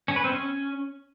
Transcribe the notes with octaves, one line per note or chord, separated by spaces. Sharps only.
C#4
B4
C4
C#4